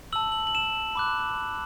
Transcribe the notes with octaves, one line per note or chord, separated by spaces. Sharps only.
A5 E6 F#7
F#7
F#7
E7
B5 D6 F#6